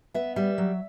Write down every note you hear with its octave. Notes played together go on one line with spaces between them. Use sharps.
B3 E5
G3 E5
F#3